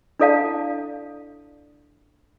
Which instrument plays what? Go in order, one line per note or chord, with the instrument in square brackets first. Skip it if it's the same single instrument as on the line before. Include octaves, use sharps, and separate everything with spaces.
[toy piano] D4 E4 A4 D5 F5 A5